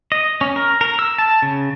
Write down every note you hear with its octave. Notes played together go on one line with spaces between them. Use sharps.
D#5
C#4
A#4
A#4
E6
A5
C#3